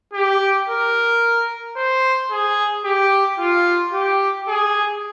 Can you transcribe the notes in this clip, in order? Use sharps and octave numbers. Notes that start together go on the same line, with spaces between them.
G4
A#4
C5
G#4
G4
F4
G4
G#4